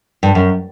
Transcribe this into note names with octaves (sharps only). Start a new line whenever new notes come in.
G2
F#2